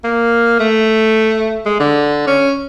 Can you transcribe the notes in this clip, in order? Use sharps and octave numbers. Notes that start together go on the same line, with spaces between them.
A#3
A3
G#3
D3
C#4